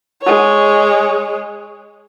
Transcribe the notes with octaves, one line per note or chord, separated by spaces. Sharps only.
G#3 C#5